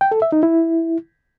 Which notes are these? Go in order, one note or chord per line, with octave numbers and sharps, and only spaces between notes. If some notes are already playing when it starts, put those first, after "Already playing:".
G5
A4
E5
D#4
E4